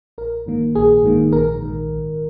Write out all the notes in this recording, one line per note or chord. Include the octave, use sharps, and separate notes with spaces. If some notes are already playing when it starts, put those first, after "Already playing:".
A#1 A#4
G#2 D#3 A#3
A#1 G#4
G#2 D#3 A#3
A#1 A#4
G#2 D#3
A#1